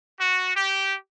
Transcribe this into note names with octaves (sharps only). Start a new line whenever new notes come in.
F#4
G4